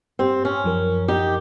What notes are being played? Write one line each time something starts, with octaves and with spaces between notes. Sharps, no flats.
G2 C4 G4
C#4
F#2 F3 A#4
D#4 G4